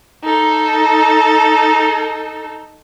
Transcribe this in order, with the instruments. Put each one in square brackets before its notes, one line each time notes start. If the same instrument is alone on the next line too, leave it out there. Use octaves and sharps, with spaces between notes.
[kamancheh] D#4 A4